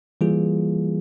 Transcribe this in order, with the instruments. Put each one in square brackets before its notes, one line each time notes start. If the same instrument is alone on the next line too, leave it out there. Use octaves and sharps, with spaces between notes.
[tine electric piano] E3 G3 A#3 F4 G#4